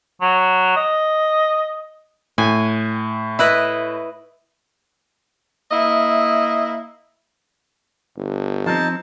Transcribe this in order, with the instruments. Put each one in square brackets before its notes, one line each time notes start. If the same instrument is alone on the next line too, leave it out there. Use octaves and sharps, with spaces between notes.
[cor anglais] F#3
D#5
[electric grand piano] A2 [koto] G#5
[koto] E4 B4 D#5
[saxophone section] A#3 E4 D#5 E5
[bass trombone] G1
[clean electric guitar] F3 C4 [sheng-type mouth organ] D#4 A5